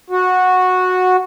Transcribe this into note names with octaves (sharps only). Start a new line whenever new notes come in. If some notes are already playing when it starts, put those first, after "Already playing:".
F#4